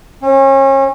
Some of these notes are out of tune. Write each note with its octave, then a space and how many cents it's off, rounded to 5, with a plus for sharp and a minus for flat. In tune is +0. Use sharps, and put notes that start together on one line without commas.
C#4 -35